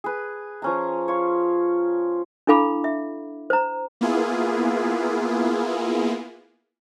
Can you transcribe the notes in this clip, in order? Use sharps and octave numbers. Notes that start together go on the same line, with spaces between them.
G#4 B4
F3 C#4 A#5
F4 C#5
D4 E4 A4 F5 B5 D6
E5
C5 A#5
A#3 B3 E4 F4 G#4